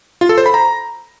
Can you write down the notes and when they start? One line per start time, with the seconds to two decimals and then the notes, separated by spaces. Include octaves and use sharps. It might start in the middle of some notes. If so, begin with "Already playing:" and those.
0.21 F4
0.29 A4
0.38 C5
0.46 B5
0.54 A#5